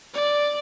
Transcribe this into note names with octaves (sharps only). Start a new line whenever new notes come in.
D5